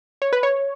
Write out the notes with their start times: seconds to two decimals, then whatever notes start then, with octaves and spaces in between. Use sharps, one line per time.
0.22 C#5
0.33 B4
0.43 C#5